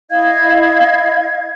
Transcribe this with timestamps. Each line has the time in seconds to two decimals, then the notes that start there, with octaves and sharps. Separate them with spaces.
0.10 E4 D#5 F5 G#6